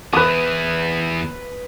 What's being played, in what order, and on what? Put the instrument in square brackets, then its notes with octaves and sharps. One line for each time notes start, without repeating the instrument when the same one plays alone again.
[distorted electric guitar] E2 E3 [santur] B4 D#6